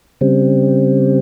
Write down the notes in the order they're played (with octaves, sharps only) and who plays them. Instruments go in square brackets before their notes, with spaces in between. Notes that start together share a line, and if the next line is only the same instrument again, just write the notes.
[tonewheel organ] C#3 G3 C4